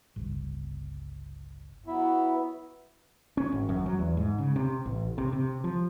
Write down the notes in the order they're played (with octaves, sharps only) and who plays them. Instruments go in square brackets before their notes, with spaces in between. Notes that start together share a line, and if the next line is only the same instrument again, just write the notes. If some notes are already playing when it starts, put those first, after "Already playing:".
[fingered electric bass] G1 C#2
[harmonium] F#3 B3 [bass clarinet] E4
[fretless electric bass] C#4
G#1
F#2
F#3
E2
G#2
C#3
C3
A1
C3
C3
F3